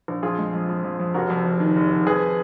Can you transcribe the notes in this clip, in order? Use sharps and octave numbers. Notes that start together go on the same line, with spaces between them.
A#1
F2 F4 G#4
G#3
F2
F2
F2
F2
F1 F#4 A#4
F2
F1
D#3
F1
F1
F2 G#4 B4